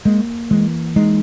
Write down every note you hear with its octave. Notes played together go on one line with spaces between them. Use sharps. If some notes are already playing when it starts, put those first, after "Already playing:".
G#3 A#3
E3 G#3
G#3 D#4